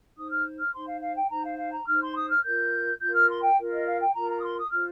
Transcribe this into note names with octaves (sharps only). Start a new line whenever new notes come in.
D#4 C5 D#6
F6
F6
D#4 C5 C6
F5
F5
G5
D#4 C5 A#5
F5
F5
A#5
D#4 C5 F6
C6
D#6
F6
F4 A#4 G6
F4 A#4 G6
F6
C6
G5
F4 A#4
D#5
F5
G5
F4 A#4 A#5
A#5
D#6
C6
D#6
F4 C5 F6